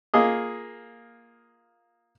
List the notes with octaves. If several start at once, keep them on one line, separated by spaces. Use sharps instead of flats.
A#3 F4 G#4 D#5